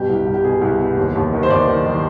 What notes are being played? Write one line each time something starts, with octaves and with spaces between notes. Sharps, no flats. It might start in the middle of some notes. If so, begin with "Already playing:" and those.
Already playing: G2 B2 G4
C2
C2
G4
B2 G#4
C2
B2
D#2
D#2
D#3
C5
D#2 D5
D#3
D#3